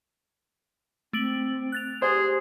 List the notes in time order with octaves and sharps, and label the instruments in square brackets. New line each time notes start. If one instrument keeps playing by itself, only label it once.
[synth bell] A3 D7 F#7 [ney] C4
[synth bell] F#6 A6 F7
[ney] G4 [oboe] G#4 [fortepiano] C5